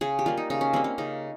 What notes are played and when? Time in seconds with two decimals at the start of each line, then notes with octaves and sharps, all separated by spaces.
0.01 C#3 G#4
0.19 G4
0.26 G3 A#3 F4
0.37 D#4
0.50 C#3 D#4
0.61 C#4
0.73 G3 A#3 C4
0.84 C#4
0.98 C#3 D#4